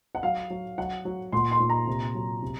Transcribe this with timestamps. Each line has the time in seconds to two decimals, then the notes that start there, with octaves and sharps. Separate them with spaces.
0.15 F#5
0.23 F#3 F5
0.50 F#3
0.78 F#3 F#5
1.05 F#3
1.33 A#2 C6
1.51 C6
1.60 A#2
1.69 A#5
1.87 C3
2.15 F#3
2.42 C3